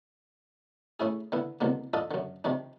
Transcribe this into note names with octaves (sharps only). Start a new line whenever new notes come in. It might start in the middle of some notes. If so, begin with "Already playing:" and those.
A3 C#4 E4 G#4
D3 B3 E4
C2 B2 D3 A#3
D4 F4 A4 D#5
F#2 D3
C3 D#3 F3 D4